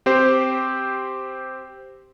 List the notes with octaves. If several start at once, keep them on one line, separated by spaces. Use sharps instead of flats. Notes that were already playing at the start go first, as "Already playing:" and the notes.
C4 G4 C5